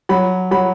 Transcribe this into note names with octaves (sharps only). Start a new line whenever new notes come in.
F#3 B5
F#3 B5